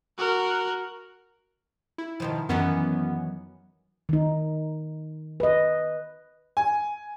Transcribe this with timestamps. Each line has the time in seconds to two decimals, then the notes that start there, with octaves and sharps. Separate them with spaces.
0.18 F#4 A#4
1.98 E4
2.20 B2 D#3 F3
2.49 F#2 D#3 E3 F#3 B3 C#4
4.09 D#3 D#4
5.40 B4 D#5
6.57 G#5